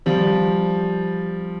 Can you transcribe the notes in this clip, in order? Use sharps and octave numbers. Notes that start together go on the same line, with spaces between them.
F3 G3